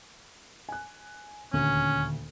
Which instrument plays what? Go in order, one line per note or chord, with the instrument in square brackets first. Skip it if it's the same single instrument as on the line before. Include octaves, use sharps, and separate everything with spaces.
[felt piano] G#5 F#6
[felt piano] D#1 D2 [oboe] C#4